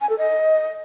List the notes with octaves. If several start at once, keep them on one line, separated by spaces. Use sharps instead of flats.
G#5
A4
D#5